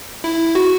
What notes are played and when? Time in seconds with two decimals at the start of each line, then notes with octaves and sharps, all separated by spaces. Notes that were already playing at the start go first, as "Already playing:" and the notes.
0.24 E4
0.55 F#4